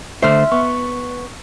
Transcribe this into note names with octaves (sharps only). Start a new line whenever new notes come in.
D3 A3 C5 E5 C6 F6
B3 C#6